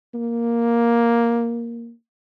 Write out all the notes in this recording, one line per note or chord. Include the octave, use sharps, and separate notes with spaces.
A#3